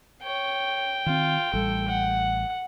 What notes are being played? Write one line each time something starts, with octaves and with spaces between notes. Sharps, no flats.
C#5 G5
D#3 C4 F4
A1 G3 A4
F#5